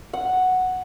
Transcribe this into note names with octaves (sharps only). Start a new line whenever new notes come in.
F#5